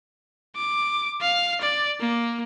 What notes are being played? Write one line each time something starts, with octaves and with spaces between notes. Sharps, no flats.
D6
F5
D5
A#3